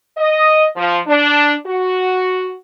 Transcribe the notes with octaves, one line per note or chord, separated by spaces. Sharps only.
D#5
F3
D4
F#4